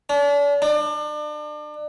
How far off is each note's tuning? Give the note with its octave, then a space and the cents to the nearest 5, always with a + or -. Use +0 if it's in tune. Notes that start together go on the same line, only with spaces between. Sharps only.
D4 -40
D4 +35